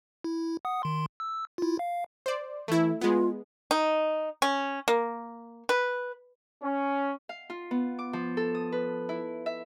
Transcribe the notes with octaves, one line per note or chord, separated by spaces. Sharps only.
E4
F#5 D#6
D#3 C6
E6
E4 F4
F5
C5 D5
E3 A3 E4
G#3 B3 F4
D#4
C#4
A#3
B4
C#4
F5
F4
B3
D6
F3
A4
D#6
B4
E4
E5